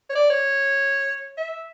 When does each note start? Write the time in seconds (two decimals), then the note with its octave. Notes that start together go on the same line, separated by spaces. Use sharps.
0.10 C#5
0.15 D5
0.30 C#5
1.37 E5